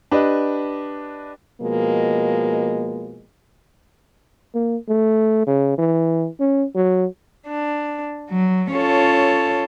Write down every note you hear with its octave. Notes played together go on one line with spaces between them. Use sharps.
D4 G4 B4 D#5
B2 F3 G#3 A#3
A#3
A3
C#3
E3
C#4
F#3
D4
F#3
C#4 F4 A4 C#5 A5